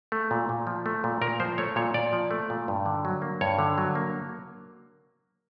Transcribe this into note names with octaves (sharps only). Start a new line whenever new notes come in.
A3
A#2
A#2
F3
A3
A#2
A#2 A#4
F3 C5
A3 C#5
A#2 C#5
A#2 D5
F3
A3
A#2
G2
D3
F#3
A#3
G2 C#5
D3
F#3
A#3